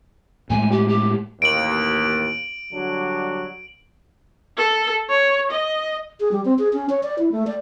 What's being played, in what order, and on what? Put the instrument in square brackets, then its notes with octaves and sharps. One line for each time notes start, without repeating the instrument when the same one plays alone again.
[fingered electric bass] A2 G#3 A3 [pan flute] G#5
[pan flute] G4
G4
[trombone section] A1 D#2 [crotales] D7 F#7
[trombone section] D3 F#3 G3
[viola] A4
C#5
D#5
[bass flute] G#4
G3
C4
G#4
C#4
C#5
D5
E4
A3
D5